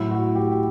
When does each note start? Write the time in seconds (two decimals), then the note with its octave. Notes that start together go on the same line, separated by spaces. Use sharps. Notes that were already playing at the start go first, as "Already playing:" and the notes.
Already playing: A2 F#3 E4
0.11 F#4
0.35 G4
0.51 G4